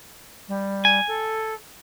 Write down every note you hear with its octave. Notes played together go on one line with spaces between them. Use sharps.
G3
G#5
A4